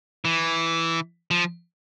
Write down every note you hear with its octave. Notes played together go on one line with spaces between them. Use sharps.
E3
F3